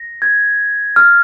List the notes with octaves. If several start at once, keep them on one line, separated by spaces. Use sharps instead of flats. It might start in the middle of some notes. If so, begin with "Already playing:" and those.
Already playing: A#6
G#6
F6